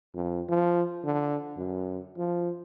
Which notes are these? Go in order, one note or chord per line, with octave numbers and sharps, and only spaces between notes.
F2
F3
D3
F#2
F3